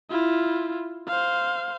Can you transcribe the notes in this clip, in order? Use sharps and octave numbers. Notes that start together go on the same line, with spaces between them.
E4 F4
C5 F5